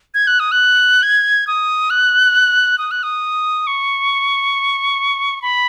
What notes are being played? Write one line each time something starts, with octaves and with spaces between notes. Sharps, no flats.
G#6
F#6
D#6
F#6
G#6
D#6
F#6
D#6
F#6
D#6
C#6
B5